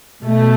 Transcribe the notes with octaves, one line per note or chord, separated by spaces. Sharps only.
B2 A3